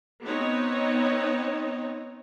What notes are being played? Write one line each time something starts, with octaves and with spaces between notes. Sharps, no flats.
B3 C4 D#4 C#5 D#5